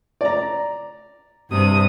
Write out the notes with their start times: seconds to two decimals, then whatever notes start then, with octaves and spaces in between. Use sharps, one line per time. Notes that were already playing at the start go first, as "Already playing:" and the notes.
0.21 D5 A#5
1.51 G2 C3 D#6